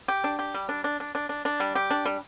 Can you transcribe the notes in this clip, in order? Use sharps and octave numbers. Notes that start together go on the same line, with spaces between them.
G4
D4
G4
G3
D4
D4
D4
D4
D4
D4
G3
G4
D4
G3